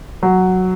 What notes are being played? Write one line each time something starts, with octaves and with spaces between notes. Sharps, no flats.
F#3